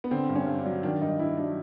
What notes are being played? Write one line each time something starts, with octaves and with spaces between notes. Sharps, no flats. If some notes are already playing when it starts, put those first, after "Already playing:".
B3
D3 C4
G2
C#4
G2
D4
F#3
D#3 D4
G2 D#4
G2 E4
F#3 D4